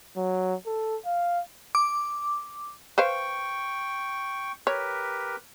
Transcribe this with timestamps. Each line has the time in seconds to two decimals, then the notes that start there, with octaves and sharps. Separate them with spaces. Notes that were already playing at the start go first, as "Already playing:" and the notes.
0.17 F#3
0.66 A4
1.06 F5
1.75 D6
2.98 B4 C5 F5 G5 C#6
4.67 G4 A#4 B4 C#5